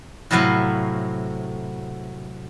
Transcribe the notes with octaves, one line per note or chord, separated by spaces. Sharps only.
A2 C3 F#3 B4 F5